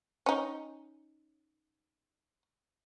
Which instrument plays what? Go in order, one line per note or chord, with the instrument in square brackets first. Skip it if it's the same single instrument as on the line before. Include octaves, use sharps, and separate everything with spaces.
[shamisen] C#4 D#4